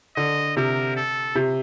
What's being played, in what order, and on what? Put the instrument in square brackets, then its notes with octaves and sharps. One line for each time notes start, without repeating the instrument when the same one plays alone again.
[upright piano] D3 [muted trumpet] D#5
[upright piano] C3 [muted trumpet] A#4
[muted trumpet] A4
[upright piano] C3